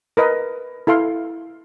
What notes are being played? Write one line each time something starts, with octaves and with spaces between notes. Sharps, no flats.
A#4 B4 D#5
E4 A4 F5 C6